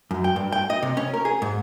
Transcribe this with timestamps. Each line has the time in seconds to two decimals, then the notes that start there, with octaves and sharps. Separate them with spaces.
0.11 F#2
0.24 G5
0.36 G2
0.52 G5
0.70 D#5
0.83 C3
0.97 C#4
1.14 A#4
1.25 G#4
1.42 G#2